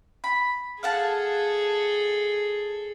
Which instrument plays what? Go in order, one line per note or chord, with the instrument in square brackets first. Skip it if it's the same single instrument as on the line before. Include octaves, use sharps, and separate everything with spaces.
[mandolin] B5
[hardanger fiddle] G#4 A4 [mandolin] F5 F#5 A5